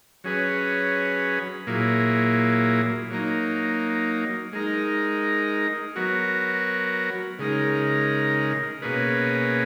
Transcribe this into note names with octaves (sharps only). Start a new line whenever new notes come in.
F#3 C#4 G#4 B4
A#2 F#3 A#3 E4 G#4
F#3 A#3 D#4
G#3 D#4 A#4
F#3 B3 F#4 A#4
C#3 G#3 D#4 A#4
B2 A#3 C#4 G#4 B4